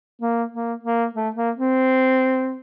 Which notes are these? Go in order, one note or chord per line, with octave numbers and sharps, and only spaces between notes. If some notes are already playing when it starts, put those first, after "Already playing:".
A#3
A#3
A#3
A3
A#3
C4